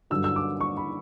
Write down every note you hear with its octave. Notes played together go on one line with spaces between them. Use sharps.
G2 D3 F#3 E6
E6
D6
C#6
B5